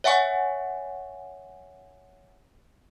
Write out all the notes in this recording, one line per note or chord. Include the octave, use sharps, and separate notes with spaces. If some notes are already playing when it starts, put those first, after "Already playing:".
C#5 E5 F#5 G#5 C#6